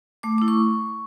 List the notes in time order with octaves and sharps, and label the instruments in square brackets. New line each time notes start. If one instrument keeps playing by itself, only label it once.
[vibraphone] A3 D6
E4 D6
C#6